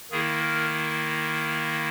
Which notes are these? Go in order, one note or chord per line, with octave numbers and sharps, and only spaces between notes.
D#3 A#3 E4 G#4
A#4